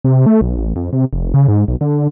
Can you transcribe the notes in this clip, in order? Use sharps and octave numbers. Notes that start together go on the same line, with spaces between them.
C3
A3
B1
A1
F2
C3
F1
C#3
G#2
B1
D3